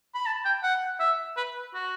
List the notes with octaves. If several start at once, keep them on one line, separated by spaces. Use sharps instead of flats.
B5
A5
G5
F#5
E5
B4
F#4